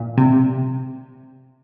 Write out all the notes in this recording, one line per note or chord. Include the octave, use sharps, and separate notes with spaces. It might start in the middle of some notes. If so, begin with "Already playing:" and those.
Already playing: A#2
C3